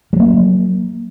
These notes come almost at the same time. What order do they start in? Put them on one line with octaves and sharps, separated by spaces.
G3 F#3 A#3